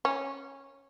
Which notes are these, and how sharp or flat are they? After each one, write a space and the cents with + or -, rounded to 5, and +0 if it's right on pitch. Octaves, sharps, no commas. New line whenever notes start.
C#4 -15